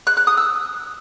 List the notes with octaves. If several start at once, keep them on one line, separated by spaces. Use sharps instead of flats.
F#6
F#6
D#6
E6